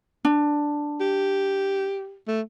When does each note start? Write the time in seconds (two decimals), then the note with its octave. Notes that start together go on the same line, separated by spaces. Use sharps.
0.25 D4
1.01 G4
2.28 A3